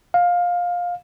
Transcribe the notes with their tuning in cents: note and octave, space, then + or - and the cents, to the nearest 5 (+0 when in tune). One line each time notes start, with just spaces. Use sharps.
F5 +15